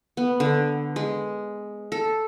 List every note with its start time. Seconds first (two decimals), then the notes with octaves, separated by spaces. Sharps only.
0.17 B3
0.40 D3
0.96 G#3
1.92 A4